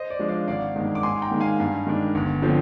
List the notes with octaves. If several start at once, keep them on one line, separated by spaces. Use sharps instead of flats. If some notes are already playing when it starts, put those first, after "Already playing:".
Already playing: C5 D#5
D5
F3 G#3 D4
D5 F5
G#1 D5 F5
G2 D#3 G#3
D6
G#2 G#5 C6
G5 A#5
D#3 G#3
F5 G#5
G2
D#3 G#3 D4
G1
D3 F3 C4